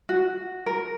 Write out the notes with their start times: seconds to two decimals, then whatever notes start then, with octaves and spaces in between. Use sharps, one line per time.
0.09 F#4
0.66 A#4